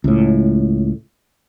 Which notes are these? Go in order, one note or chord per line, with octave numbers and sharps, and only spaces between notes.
C#2 A2